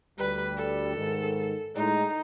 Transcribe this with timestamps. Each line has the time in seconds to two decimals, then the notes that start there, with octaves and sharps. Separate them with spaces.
0.19 D2 G3 B4
0.58 A4
0.96 G#2 D#3
1.75 A2 G#3 D#4